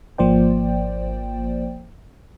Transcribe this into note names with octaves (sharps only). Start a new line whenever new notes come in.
G#1 F3 A#3 C5 D5 G5